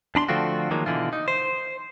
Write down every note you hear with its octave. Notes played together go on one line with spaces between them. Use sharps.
E2 D4 B5 C6
D3 F3 A3 C4 F4 F#4
D#3 F3 F#3 G#3 A#3
B2 D3 E3 F4
D#4
C5